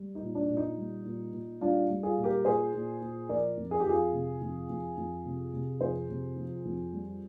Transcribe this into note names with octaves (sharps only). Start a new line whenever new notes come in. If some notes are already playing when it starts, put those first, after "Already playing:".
Already playing: G3
D#4
A#2
D4
A#2
D#4
G3
A#2
A#2
G3 D4 F4
G3
F4 G#4
A#2
G4 A#4
A#2 G#4 C5
A#2
A#2
F3 A#4 D5
F2
G#4
G4
F2 F4 G#4
C3
F2
F2
F2
C3
C3
F2 G#4 C5
C3
F3
F2
G3